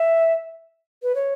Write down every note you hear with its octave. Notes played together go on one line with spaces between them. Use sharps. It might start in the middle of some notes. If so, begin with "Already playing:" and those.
Already playing: E5
B4
C#5